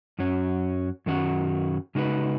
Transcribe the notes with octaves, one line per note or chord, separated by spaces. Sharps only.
F#2 F#3 C#4
F#2 D#3 F#3 C#4 F#4
C#3 G#3 D#4 F#4 B4